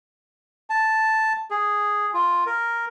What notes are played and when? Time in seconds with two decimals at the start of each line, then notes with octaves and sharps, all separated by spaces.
0.70 A5
1.51 G#4
2.14 F4
2.46 A#4